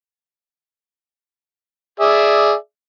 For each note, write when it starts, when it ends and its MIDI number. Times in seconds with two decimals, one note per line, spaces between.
2.00 2.54 68
2.00 2.54 74
2.00 2.54 76